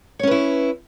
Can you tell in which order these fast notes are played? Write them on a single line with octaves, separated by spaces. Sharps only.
C#5 C#4 B4 E4